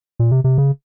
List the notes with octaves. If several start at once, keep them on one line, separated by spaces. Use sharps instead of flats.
A#2
C3
C3
C#3